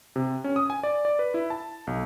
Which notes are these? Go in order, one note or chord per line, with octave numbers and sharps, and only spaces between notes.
C3
C#4
D#6
G#5
D5
D5
B4
E4
A5
B1